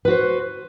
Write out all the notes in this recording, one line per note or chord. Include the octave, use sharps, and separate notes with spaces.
F#4 B4 C5